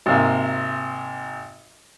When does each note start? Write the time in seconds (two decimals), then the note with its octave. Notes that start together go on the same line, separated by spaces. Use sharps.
0.06 G#1 C3 A#3